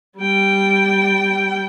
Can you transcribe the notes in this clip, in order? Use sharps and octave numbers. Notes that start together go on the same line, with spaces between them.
G3 G5